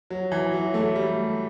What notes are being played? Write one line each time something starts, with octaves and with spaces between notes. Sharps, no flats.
F#3
E3
F#3
A3
G3